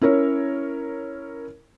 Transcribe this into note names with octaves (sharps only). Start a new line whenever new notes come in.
C#4 E4 A#4 C#5